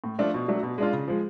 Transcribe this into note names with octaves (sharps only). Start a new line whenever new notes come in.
A2
F3 A3 D4 F4
B2
F#3 A3 D4
B2
G#3 D4 F4
C#3
F3 G#3